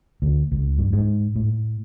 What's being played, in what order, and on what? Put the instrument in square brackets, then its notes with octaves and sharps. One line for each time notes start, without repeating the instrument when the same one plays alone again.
[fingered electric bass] D2
C#2
G2
G#2
A2